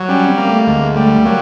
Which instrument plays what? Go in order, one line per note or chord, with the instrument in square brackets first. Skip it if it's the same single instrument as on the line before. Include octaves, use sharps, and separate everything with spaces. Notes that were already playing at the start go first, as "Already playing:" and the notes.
Already playing: [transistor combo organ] F#3
[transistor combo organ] G3 [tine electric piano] C#4
[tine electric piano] C4
[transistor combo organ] A#3
[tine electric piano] A3
[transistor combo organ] D2 [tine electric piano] G#3
[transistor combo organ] G3 [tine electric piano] A3
[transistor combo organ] F#3 [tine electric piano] A#3